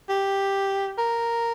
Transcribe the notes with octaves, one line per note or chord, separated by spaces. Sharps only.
G4
A#4